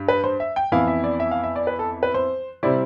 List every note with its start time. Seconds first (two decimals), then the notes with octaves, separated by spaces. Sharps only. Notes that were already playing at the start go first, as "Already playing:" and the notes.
Already playing: G2
0.08 B4
0.24 C5
0.40 E5
0.56 G5
0.72 F2 E3 B3 E4 F5
0.88 E5
1.04 D5
1.20 E5
1.31 F5
1.44 E5
1.56 D5
1.67 B4
1.79 A4
2.03 B4
2.14 C5
2.63 C3 G3 C4 E4 D5